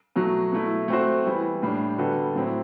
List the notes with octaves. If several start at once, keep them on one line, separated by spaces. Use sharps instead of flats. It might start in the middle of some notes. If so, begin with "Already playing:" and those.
B2 F#3 A3
B2 A3 E4
A3 C4 F#4 C5
E3 G3 B3 E4
A2 G3 D4
D3 G3 B3 F#4 A4
A2 F#3 C4 E4